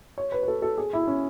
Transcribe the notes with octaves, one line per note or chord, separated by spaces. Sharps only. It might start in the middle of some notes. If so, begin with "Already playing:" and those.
C#5
B4
B4
A4
A4
G#4
E4
C#4